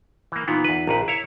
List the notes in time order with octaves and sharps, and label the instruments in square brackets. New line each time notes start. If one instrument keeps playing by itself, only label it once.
[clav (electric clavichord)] E3 A#3
[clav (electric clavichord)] A#2 E3 B3 [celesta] D#4 F4
[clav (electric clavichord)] E2 B4
[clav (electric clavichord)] A#1 F2 B4 [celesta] A#5
[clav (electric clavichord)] E4 C#5